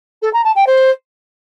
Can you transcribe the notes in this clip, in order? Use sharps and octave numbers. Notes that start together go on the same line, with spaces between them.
A4
A#5
A5
G5
C5